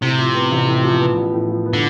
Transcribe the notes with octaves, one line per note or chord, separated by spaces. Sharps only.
A2 C3
F3
B3
A1
A2
F3
B3
A1
A2
F3
B3
D3